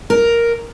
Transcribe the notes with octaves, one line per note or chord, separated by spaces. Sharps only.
A#4